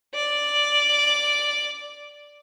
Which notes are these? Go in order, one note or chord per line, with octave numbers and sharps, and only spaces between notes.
D5